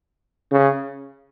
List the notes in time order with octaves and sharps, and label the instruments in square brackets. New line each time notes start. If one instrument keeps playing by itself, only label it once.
[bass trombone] C#3